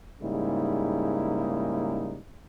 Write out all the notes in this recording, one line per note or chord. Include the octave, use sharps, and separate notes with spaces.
G#2 C#3 G3 A#3 D#4 E4